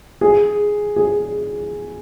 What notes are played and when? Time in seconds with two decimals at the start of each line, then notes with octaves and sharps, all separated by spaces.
0.21 G#4
0.96 G#4